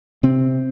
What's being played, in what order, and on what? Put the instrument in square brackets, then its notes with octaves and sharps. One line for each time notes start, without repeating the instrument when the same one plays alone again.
[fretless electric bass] C3 C4